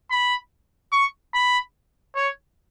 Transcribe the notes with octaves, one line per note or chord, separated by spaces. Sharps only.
B5
C#6
B5
C#5